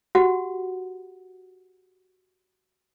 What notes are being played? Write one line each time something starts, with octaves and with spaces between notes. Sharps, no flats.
F#4 G4 F#5